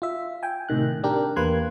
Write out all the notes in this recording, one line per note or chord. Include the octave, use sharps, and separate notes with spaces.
F4 E5
G5 G#5
A2 C3 D#3 F#6
D4 G4 A#4
E2 A#3 B4 C6 F#6 G#6